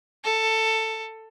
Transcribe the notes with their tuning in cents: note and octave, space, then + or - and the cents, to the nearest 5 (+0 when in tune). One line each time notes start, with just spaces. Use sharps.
A4 +15